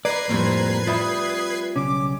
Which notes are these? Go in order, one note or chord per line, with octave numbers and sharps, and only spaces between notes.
B4 D5 A#5 G#6 C7
F2 A2 G3 A#3 C4
G3 F4 E5 B5 D#6
B1 C#3 C#4 D6